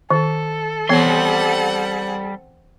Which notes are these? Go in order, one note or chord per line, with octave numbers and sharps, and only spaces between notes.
D#3 A4
E3 G3 B3 C4 F#5 C6